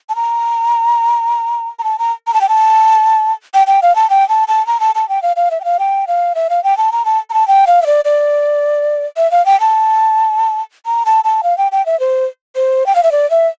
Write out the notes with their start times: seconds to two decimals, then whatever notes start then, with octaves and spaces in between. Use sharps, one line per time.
0.09 A5
0.16 A#5
1.79 A#5
1.84 A5
1.99 A#5
2.27 A#5
2.34 A5
2.41 G5
2.49 A5
3.54 G5
3.67 G5
3.82 F5
3.95 A5
4.10 G5
4.29 A5
4.48 A5
4.67 A#5
4.80 A5
4.95 A5
5.09 G5
5.22 F5
5.36 F5
5.51 E5
5.61 G5
5.64 F5
5.79 G5
6.07 F5
6.35 E5
6.50 F5
6.64 G5
6.77 A5
6.92 A#5
7.05 A5
7.30 A#5
7.34 A5
7.48 G5
7.67 F5
7.82 E5
7.86 D5
8.05 D5
9.17 E5
9.31 F5
9.46 G5
9.60 A5
10.86 A#5
11.06 A5
11.24 A5
11.43 F5
11.58 G5
11.72 G5
11.86 E5
12.00 C5
12.56 C5
12.86 G5
12.95 F5
13.03 E5
13.12 D5
13.30 E5